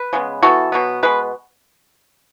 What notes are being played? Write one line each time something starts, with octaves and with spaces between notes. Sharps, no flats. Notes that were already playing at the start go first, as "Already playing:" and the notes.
Already playing: B4
C#3 G#3 B3
E3 G#3 B3 F#4 A4
B2 F#3 B3
B2 G#3 B3 B4